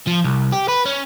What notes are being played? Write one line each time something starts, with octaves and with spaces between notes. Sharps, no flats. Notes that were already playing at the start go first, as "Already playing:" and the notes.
F3
C2
G4
B4
C#4